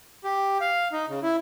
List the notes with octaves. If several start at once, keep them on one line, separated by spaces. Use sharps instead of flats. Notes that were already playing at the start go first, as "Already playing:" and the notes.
G4
F5
D#4
C#3
E4